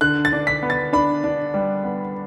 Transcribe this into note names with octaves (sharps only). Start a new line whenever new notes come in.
D3 F#6
A6
D4
B6
B3
A6
D4 B5
D4
G3
B3